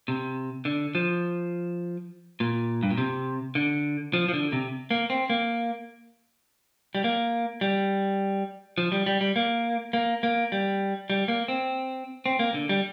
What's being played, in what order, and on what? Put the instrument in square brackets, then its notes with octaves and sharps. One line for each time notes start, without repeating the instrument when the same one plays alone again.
[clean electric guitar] C3
D3
F3
A#2
G2
A#2
C3
D3
F3
F3
D3
C3
A#3
C4
A#3
G3
A#3
G3
F3
G3
G3
G3
A#3
A#3
A#3
G3
G3
A#3
C4
C4
A#3
D3
G3